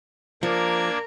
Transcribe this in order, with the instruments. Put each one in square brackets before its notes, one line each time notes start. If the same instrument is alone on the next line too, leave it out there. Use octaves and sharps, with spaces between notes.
[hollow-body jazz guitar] F3 [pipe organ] A#3 D4 G#6 [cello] A#4